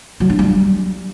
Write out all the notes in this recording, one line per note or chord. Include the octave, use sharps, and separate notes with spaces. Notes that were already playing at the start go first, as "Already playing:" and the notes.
F#3
D4
G3